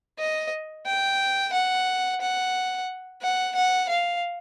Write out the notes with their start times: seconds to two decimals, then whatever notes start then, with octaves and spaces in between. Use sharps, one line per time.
0.19 D#5
0.86 G5
1.53 F#5
2.21 F#5
3.21 F#5
3.55 F#5
3.89 F5